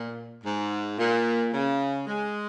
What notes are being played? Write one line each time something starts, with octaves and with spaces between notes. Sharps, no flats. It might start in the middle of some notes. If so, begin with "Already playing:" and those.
Already playing: A#2
G#2
A#2
C#3
G#3